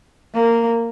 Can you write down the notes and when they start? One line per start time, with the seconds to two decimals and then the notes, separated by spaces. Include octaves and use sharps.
0.34 A#3